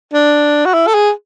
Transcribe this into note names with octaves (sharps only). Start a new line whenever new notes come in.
D4
F#4
E4
A4
G#4